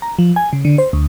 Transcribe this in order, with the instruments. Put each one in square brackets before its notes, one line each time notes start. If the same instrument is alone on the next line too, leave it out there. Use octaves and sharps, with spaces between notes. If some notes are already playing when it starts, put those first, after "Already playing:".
[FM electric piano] A#5
F3
G#5
C#3
D3
C5
D2